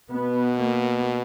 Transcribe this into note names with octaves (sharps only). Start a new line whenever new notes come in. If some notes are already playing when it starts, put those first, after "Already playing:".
B2 B3
A#3